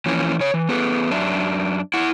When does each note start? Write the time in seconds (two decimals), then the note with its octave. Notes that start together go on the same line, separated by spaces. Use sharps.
0.06 E3 F3 A#3 C#4
0.40 C#3 C#5
0.54 E3
0.69 B3 G#4 A4 B4
1.11 F#2 D4 E5
1.94 E4 F#5